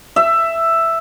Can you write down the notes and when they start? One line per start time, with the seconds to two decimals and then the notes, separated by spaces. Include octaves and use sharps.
0.16 E5